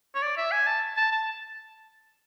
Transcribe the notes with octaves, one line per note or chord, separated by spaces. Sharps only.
C#5
D5
E5
G#5
A5
A5
A5